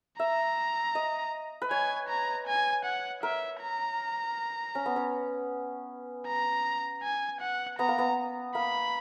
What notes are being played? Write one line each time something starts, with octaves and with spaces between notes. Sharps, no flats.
E5 A#5
D#5
B4
C#5 G#5
A#5
G#5
F#5
A#4 E5
A#5
C#4
B3
C#4
A#5
G#5
F#5
B3 A#5
A#3
B3
A#3 B5